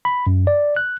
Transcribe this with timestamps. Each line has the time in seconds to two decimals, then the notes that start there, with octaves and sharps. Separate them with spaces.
0.05 B5
0.27 F#2
0.47 D5
0.76 F#6